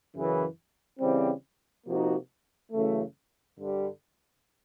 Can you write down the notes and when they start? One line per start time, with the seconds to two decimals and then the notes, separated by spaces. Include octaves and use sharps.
0.14 F#2 C#3 E3
0.99 C#3 E3 G3 C4
1.85 C3 F3 A#3 D#4 F#4
2.71 F#2 C#3 E3 A3
3.57 G2 D3 G3